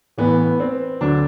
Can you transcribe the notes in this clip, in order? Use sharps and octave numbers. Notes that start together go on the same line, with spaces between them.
A1 A2 E3 B3
C4
D2 D3 F#3 D4